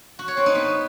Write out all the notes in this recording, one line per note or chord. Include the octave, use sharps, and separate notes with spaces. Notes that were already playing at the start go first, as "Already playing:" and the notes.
F#4
C#5
C4
D#4
B3